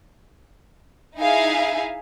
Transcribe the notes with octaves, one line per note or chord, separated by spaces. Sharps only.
D#4 E4 G#4 E5 F5